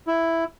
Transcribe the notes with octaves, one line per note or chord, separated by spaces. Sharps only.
E4